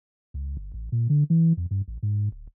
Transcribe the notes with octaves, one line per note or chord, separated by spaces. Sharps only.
C#2
G1
A1
A#2
D3
E3
F2
G2
A1
G#2
D1